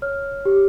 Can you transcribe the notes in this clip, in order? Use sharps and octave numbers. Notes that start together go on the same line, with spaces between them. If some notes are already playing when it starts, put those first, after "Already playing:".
C#5 F6
G4